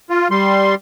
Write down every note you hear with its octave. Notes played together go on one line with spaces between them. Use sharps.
F4
G3 C6